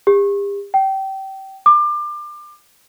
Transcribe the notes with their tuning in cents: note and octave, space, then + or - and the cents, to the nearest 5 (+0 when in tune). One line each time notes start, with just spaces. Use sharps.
G4 +40
G5 -25
D6 +30